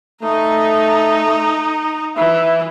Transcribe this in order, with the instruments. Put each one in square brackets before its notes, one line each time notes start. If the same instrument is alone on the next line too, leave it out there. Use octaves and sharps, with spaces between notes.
[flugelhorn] A3 [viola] D#4 A#5
[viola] E3 [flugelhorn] E5